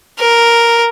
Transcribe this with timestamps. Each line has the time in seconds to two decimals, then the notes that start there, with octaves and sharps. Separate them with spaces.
0.20 A#4